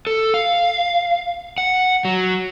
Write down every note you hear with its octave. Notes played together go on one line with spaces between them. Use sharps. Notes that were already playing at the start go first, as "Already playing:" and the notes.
A4
F5
F#5
F#3